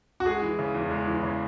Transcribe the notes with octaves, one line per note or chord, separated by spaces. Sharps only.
F#4
G#3 G#4
E3
C#3
E2
G#3
E3
C#3